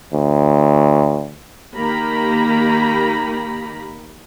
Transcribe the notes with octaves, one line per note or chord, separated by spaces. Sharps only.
D2
D#3 A#3 G4 A#5 B5